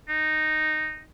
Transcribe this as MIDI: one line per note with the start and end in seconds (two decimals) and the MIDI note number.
0.09 1.02 63